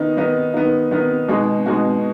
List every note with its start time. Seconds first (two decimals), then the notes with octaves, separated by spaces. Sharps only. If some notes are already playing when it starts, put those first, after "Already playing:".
Already playing: D#3 B3 D#4
0.17 D#3 B3 D#4
0.54 D#3 B3 D#4
0.91 D#3 B3 D#4
1.28 B2 G#3 D#4 F#4
1.66 B2 G#3 D#4 F#4